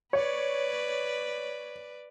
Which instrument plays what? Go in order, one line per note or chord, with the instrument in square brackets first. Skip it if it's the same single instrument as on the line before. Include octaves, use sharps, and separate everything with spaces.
[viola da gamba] B4 D5 [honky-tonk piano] C#5